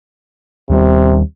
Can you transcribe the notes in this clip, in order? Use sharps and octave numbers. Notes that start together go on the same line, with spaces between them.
D#2 C3 G3